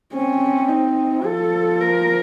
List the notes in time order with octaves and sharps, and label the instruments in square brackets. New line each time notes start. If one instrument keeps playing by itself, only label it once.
[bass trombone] C4 [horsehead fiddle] C#4
[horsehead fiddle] D#4
[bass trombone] F3 [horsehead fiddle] A4
[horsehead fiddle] A#4